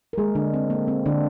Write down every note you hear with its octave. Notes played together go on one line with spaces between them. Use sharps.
A#4
D#3 G3 G#3 A#3 G#4
D3 D4
C4
A#3
C4
D3 D4